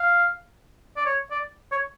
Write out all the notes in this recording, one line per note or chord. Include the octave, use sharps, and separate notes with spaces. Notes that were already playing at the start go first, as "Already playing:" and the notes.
Already playing: F5
D5
C#5
D5
C#5